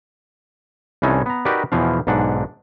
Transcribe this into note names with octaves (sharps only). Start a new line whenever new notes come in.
C2 E3 C#4 D#4 A4
B3 A#5
D#4 F#4 G4 A#4 B4 D5
E2 B2 E3 F3 F5
B1 G#2 D4 F#5